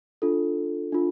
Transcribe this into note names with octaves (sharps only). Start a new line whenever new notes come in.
D4 F4 A4
D4 F4